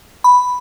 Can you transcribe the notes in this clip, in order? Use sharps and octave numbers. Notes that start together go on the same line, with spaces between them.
B5